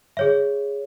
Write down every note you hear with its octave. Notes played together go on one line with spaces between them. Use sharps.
G#4 C#5 E5